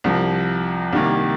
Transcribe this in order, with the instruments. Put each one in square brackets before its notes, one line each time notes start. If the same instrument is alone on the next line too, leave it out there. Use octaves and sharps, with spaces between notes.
[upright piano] C2 C3 F3
C2 C3 D#3 A#3